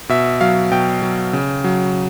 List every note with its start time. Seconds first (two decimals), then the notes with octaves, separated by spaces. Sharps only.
0.09 B2 E5
0.41 F#3 F5
0.71 B2 G5
1.02 F#3
1.33 C#3
1.64 F#3